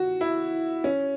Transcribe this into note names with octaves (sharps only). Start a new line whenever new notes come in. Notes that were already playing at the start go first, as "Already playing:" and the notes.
Already playing: F#4
E4
C#4